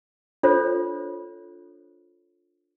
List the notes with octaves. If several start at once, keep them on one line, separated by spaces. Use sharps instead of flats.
D4 F4 A4 C5 C#5